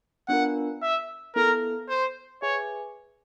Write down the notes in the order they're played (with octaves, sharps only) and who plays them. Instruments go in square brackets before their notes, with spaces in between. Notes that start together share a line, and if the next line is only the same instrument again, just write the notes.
[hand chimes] B3 D4 F4 A#4 [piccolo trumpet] F#5
[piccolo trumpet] E5
[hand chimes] B3 E4 A4 [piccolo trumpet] A#4
[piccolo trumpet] C5
[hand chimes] G#4 B4 E5 G#5 [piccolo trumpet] C#5